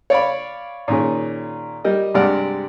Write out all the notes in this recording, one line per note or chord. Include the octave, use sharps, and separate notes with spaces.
C#5 D5 F5 B5
A#2 D#3 C#4 G#4
G3 A#4 D#5
G2 C3 G#3 D5 F#5 F6